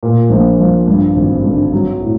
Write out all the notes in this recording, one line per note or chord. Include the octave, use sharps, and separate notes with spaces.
A#2
A#1
F3
G2
G#1
D3
F#3
A2